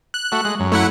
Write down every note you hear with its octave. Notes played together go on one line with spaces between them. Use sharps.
F#6
A3 F#4
G#3
F#2
A3 E4 F#5